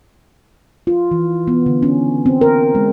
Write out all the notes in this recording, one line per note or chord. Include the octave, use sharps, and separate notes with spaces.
F4
E3
B3
D3
C#4
C4
A#4
G#3